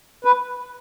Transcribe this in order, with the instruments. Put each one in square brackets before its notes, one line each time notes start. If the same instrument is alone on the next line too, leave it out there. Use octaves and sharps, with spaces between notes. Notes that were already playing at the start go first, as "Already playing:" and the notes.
[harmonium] B4